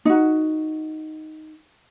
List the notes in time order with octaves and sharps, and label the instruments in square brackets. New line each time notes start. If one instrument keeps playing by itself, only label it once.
[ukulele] D#4 F#4